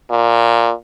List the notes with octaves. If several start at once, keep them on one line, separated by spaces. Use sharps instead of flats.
A#2